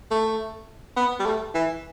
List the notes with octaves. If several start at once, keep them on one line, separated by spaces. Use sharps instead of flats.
A3
B3
G3
A3
E3